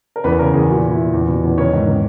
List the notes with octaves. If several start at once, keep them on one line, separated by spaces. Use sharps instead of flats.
A#4
E2 B4
C#3 A#4
E2 G#4
A#2 F#4
A#2
E4
A#2
E2
B2
E2
D#3 C#5
G#2
D#3